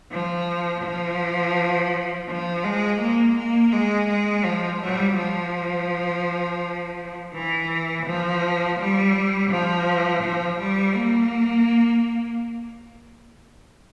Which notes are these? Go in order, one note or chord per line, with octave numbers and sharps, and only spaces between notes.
F3
F3
F3
G#3
A#3
A#3
G#3
G#3
F3
G3
F3
E3
F3
G3
F3
F3
G3
A#3